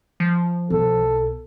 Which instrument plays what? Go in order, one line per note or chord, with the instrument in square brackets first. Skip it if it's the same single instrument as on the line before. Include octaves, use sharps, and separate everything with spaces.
[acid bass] F3
[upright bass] B1 [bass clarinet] A4